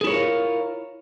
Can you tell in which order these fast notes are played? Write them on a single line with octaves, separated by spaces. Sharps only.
G#4 E4 C#5 A#4 F4